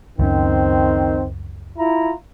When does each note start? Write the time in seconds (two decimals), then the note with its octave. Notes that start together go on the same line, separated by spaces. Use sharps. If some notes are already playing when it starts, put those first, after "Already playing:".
0.19 C#2 F#2 D#3 C4 C#4
1.79 E4 F4 A#5